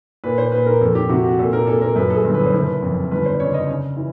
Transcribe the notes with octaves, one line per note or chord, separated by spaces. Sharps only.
A#2 B4
C5
A#2 B4
A#4
F2 A4
G4
C3 F#4
F#4
A#2 A4
A#4
A#2 A4
A#4
F#2 B4
A4
G#4
G1
B4
C5
F#1 B4
F2
G1 B4
C5
D5
C#3 C#5
D#5
C#3
E3